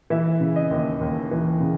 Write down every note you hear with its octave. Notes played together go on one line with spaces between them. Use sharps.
E3 E5
C#3
D#5
D#2
D#2
E3
C#3